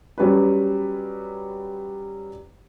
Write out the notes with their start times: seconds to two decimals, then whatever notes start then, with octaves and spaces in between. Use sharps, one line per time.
0.18 F#3 G3 C#4 B4